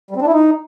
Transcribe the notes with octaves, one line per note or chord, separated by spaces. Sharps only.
G3
C4
D4
E4
D#4